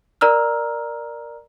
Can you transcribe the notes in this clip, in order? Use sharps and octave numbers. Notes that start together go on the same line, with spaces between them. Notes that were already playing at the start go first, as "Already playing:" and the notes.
A#4 D5 A#5 E6 F6